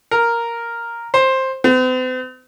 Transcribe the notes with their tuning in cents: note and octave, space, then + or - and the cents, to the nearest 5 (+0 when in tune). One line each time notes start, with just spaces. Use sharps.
A#4 +0
C5 +10
C4 -45